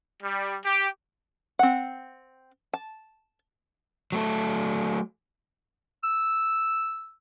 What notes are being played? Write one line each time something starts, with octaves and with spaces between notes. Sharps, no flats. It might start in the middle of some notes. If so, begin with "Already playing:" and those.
G3
G4
C4 F#5
A5
F#3 A3 A4
E6